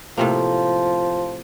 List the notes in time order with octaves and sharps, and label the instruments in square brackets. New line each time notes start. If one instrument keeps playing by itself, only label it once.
[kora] A2 C3 A#3 [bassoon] F3